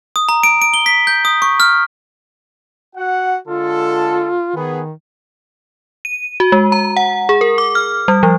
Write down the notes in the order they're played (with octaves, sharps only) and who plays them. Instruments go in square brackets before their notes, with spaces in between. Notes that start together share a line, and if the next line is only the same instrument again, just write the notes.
[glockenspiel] D#6
A#5
D7
D7
G7
B6
G6
D#6
C#6
F6
[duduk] F#4 [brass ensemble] F#5
[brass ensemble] D3 G#3 A4 [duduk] F4
[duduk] D#3 [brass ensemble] B3 G#4
[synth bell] D#7
F#4
G#3
A#5
F#5
G#4
A#4
D6
F6
G3
F3